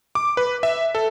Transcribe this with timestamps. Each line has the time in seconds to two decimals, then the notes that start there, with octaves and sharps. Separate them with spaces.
0.15 D6
0.37 B4
0.63 E5
0.95 A4